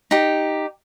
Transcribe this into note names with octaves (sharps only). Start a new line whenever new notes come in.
D#4 G4